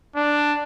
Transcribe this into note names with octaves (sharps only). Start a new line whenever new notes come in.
D4